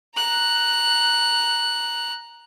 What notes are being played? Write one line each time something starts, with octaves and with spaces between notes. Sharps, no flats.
A#5 F#6